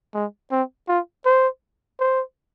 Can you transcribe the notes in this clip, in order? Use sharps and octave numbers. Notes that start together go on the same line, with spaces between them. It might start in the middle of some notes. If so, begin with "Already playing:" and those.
G#3
C4
F4
C5
C5